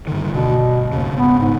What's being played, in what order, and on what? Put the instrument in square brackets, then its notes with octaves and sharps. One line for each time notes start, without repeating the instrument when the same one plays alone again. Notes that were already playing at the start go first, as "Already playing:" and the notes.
[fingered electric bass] G2 D3 D#3
[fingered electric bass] D2 D3 [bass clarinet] B2
[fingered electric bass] G1
[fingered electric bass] G#1 C#3 [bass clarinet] D#2
[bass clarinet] B3
G#2